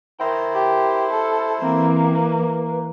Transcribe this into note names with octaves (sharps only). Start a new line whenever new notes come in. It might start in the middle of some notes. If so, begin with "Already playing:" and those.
E4 A#4 C5 G5
G4
A4
E3 A#3 C4
B4